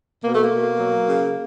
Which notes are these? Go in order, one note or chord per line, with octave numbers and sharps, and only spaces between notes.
B2 A#3
A3
A#3
B2
F#3
C#3